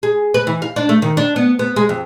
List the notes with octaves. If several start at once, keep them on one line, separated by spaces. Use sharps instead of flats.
G#4
B4
E3
F5
D4
A3
D#3
D4
B3
B3
G#3
F2